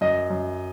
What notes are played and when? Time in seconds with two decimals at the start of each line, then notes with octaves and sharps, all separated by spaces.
0.01 F#2 D#5
0.30 F#2